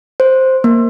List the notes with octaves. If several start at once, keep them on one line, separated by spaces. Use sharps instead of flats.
C5
A#3